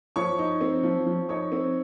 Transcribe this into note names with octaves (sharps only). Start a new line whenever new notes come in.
F3 C#5 C#6
D#4
C4
F3
F3
D#4 C#5 C#6
C4